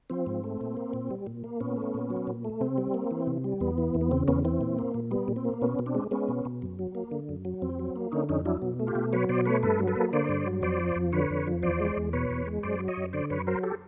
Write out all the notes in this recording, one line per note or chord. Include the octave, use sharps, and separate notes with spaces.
F3 C4
G#2
A3
A#2
A#3
A#2
G3
A#2
A#3
A#2 B3 C#4
A3
A#2
F#3
A#2
A3
C3 C4
G3
A#3
E3
C3
G3
E2 B3
E3
E2
B3
C#3 C4
E2 B3 C#4
E3 C4
A#2
A#3
A#2
G3 B3
A#2
C4
A#3
B2 B3 C#4
B2
C4 D4
G#3
G#3 B3 C#4
B2
B2
F#2
F#3
A#3
D3
F#2
F#3
F2 C4
F#3
A#3
D3 C#4 D#4
F2 C#4 D#4
F#3 D4 E4
B2
A3
F4 G4
B2
F#3 B4 C#5
B2 C5 D5
A3 B4 C#5
G2 A4 B4
F#3
A4 B4
A#3
D3 C5 D5
G2
F#3
F2 C5 D5
F3
F2
D3 B4 C#5
F2
F3
E2 C5 D5
G#3
E2
B2 B4 C#5
E2
G#3
F#2 C5 D5
F#3
C#5 D#5
F#2
D3 C5 D5
F#2 B4 C#5
F#3 A#4 C5
G4 A4